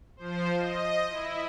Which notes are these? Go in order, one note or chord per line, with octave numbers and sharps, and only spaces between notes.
F3 C5
D#5
E4